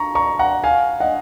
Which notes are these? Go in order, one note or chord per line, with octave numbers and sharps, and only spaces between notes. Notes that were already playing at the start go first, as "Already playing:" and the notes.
Already playing: A#5 C#6
A#5 C#6
F#5 A#5
F5 G#5
D#5 F#5